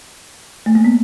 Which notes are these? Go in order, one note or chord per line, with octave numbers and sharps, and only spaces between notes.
A3
A#3
B3